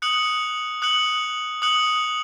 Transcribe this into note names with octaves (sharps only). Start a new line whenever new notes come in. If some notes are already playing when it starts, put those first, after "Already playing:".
D#6 F#6 C#7 F#7
D#6 F#6 C#7 F#7
D#6 F#6 C#7 F#7